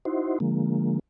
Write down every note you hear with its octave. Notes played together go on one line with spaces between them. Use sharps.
D#4 E4 F#4 C5
D3 F3 G#3 A#3